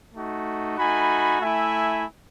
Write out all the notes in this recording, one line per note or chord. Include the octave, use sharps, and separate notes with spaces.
A3 D#4 F#4
A3 D#4 F#4 G#5 B5
A3 E4 E5 G#5